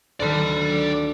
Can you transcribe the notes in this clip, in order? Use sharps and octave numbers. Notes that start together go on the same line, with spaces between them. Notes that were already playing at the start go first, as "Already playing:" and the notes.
D2 D3 D#3 D5 B5